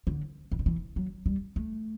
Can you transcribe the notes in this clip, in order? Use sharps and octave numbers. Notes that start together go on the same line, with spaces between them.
D3
E3
D3
E3
F#3
G3
A3